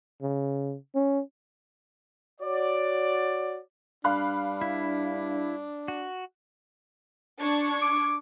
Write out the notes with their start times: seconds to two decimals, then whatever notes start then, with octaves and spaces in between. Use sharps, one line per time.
0.22 C#3
0.95 C#4
2.41 F#4 C#5 D5
4.04 G2 D4 F5 B5 F#6
4.61 E4
5.88 F#4
7.40 D4 C#6 G#6
7.82 D6